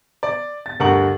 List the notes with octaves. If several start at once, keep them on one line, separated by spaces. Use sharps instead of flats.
D5
A6
D2 G2 A#4 F#5 C#6 F#7